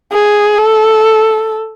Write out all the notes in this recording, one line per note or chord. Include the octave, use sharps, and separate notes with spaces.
G#4
A4